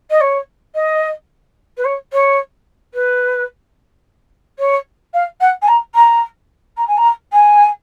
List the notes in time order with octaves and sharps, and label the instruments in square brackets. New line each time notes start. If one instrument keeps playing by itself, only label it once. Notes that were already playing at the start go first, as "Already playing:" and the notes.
[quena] D#5
C#5
D#5
B4
C#5
C#5
B4
C#5
F5
F#5
G#5
A#5
A#5
A#5
G#5
A#5
G#5